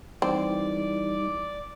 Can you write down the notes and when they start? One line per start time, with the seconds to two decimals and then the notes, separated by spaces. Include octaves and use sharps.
0.22 E3 G3 C4 D#4 D5